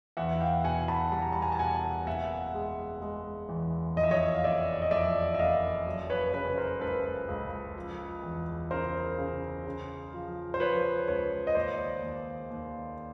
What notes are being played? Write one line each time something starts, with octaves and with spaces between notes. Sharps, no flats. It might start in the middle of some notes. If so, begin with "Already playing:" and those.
E2 E5 F#5
F5 G5
B2 F#5 G#5
A5 B5
G3 B5
A#5
A5
G#5 A#5
A5
B2 F#5 G#5
F#1 E5 F#5
G#3
G#3
E2
F2 D#5
E5
C#5 D#5
F5
F#1 D5 E5
D#5
F2 D5 E5
E5
F#1 D#5 F5
F#3
B4 C#5
C#3 B4 C#5
A#4 C5
C#2 A4 B4
C#2
F3
E2
C#3 A#4 C5
C#3
C#3
F3
C5
F3 B4 C#5
C#2 B4 C#5
D#5
D#2 C5 D5
D#2
D#2